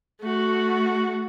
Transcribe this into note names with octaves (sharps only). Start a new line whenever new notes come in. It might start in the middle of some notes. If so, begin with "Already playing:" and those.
A3 F#4